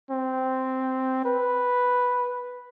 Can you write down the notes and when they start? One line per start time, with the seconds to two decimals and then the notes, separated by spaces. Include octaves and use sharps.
0.10 C4
1.25 B4